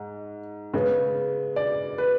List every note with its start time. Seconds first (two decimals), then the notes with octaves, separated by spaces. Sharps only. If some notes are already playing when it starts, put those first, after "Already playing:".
Already playing: G#2
0.74 C#3 G#3 B3
1.56 D5
1.98 B4